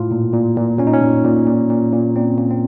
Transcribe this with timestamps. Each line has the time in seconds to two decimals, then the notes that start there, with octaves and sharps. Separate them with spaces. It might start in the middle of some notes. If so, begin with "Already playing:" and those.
Already playing: A2 F4
0.11 A#2
0.34 A#2
0.57 A#2
0.78 A#2 C#4
0.87 D#4
0.93 C#4
1.02 A#2
1.25 A#2
1.47 A#2
1.70 A#2
1.93 A#2
2.16 A#2 C4
2.38 A#2
2.50 C4